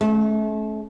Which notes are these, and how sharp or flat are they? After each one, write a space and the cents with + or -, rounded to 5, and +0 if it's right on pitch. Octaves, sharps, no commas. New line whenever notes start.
A3 -35 C#4 +0